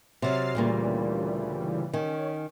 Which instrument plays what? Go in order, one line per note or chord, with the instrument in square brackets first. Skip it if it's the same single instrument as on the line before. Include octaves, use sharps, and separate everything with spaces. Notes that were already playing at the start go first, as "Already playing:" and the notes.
[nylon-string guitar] C3 F#3 [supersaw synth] F6 A6 C7
[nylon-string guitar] D2 A#2 A#3 [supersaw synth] C#3 E3 G3
[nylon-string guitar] D#3 [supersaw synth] C#4